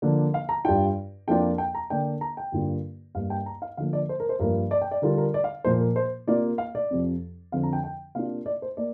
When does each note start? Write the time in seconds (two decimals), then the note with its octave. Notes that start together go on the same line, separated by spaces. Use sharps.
0.02 D3 F3 A#3 D4
0.34 F5
0.49 A#5
0.64 G2 G3 D4 F4 G5
1.27 F2 F3 A#3 D4 F4 G5
1.58 G5
1.75 A#5
1.90 D3 A#3 D4 G5
2.21 A#5
2.37 G5
2.52 G2 D3 A#3 D4 F4
3.15 G2 G3 A#3 F5
3.30 G5
3.46 A#5
3.62 F5
3.77 D3 F3 A#3 F5
3.93 D5
4.09 C5
4.20 A#4
4.29 C5
4.39 G2 F3 A#3 A#4
4.71 D5
4.81 G5
4.91 D5
5.02 D3 G3 D4 F4 A#4
5.18 A#4
5.34 D5
5.44 F5
5.64 A#2 F3 A#3 C5
5.81 A#4
5.96 C5
6.27 C3 A#3 F4 D5
6.58 F5
6.75 D5
6.91 F2 C3 F3
7.52 F2 D3 F3 C4 F5
7.63 A#5
7.73 G5
7.84 G5
8.15 C3 A#3 D4 F4 F5
8.46 D5
8.62 C5
8.77 A#3 D5